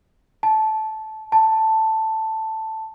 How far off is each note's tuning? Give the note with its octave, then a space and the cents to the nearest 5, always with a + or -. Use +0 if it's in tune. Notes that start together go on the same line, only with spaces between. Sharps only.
A5 -15
A5 +5